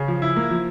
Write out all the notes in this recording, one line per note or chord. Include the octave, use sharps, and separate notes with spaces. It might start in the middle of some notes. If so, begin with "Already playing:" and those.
Already playing: C#3
F3
E4
A#3
F3